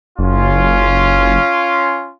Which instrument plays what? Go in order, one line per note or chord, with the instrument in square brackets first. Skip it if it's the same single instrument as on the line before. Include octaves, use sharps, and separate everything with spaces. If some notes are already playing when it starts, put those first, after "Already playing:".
[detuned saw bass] F#1 [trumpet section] C#4 F4